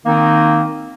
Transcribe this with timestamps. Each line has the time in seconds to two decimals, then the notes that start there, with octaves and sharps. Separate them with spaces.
0.06 D#3 A#3 C4 D#4